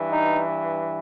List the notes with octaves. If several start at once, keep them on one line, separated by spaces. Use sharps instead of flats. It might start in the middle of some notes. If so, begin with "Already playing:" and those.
Already playing: G2 E3
D#4